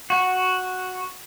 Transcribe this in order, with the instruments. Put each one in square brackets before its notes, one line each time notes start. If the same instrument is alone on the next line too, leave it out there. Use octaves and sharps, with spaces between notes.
[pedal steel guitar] F#4